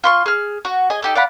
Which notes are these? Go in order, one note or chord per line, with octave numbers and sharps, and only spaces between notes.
F4 C6 C#6
G#4 F6
F#4
G#4 D#5 G#5
D#4 G4 A4
D5 F5 F#5 B5